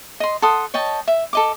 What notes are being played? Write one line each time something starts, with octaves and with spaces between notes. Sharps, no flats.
D#5 C6
A4 F#5 C6 D#6
C#5 D#5 G5 A5
E5
A4 D#5 D6